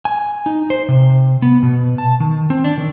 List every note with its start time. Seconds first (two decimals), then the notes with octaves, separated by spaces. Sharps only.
0.05 G#5
0.46 D#4
0.70 C5
0.89 C3
1.42 B3
1.63 B2
1.98 A5
2.20 D#3
2.50 C4
2.64 D4
2.78 D#3